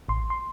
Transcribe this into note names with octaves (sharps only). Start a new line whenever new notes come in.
A1 C6
C6